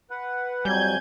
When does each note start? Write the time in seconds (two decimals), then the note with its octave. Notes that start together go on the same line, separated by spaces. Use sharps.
0.11 B4 F#5
0.65 F2 F#3 G3 G#5 G6 G#6